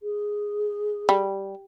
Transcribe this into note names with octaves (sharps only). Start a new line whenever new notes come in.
G#4
G3